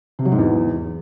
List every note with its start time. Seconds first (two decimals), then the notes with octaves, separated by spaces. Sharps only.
0.19 C3
0.25 F#3
0.32 G#2
0.38 E2